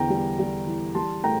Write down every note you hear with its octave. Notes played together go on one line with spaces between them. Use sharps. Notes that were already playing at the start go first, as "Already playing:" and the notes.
Already playing: E2 D3 G5 A#5
G3
G3
E3
G3 A5 C6
A2 G5 A#5